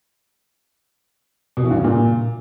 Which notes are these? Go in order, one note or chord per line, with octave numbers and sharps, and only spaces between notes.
B2
E3
G2
C#3
A#2